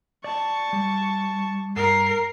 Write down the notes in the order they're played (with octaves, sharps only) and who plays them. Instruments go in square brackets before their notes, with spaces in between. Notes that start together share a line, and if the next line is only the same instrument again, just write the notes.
[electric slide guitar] D5 [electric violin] A5 C#6
[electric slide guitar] G3
[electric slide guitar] G2 [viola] A#4 [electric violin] C7